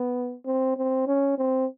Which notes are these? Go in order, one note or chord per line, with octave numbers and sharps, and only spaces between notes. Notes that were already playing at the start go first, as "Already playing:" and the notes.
Already playing: B3
C4
C4
C#4
C4